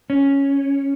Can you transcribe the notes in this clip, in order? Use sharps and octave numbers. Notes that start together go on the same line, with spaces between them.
C#4